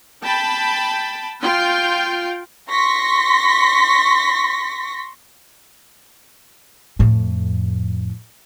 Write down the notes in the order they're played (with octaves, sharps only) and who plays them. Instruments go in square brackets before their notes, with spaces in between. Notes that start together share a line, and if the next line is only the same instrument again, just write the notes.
[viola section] G5 A5 B5
F4 G5
[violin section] C6 C#6 A#6 B6
[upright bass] F2 A2